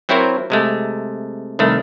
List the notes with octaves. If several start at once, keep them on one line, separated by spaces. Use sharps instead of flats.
F#3 C4 E4 F#4 A#4 C5
C3 G#3 A3
C2 D#3 A3